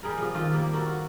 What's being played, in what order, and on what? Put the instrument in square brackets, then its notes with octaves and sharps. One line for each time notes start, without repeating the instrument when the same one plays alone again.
[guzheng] G3 G#4 A#4
C3 F3
D#3 F3 F4 A4
G3 A#3 C4 G4
F#4 A4 A#4
F#4